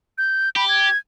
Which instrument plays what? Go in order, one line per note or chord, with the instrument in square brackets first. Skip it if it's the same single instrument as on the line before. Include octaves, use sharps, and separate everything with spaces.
[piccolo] G6
[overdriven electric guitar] G4 [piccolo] B5
[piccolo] G#6